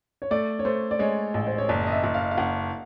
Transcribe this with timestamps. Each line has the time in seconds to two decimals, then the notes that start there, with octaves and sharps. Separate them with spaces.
0.22 C#5
0.31 A3 D5
0.59 C#5
0.65 A3 C5
0.91 D5
0.99 G#3 C#5
1.34 A1
1.47 C5
1.58 C#5
1.68 F#1 D5
1.87 D#5
1.92 E5
2.03 F#1
2.14 F5
2.31 F5
2.38 F#1 F#5